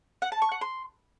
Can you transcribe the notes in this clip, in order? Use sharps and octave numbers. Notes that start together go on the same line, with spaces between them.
F#5
A5
C#6
F#5
C6